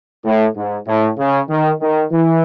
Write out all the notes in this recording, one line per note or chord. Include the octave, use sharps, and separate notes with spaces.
A2
G#2
A2
C#3
D#3
D#3
E3